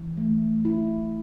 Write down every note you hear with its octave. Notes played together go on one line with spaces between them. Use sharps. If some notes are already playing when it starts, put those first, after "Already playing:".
Already playing: E3
A3
E4